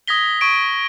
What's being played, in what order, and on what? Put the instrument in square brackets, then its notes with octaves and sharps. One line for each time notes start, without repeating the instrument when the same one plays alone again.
[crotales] D#6 G#6 A#6 B6 G7
C#6 G#6 D7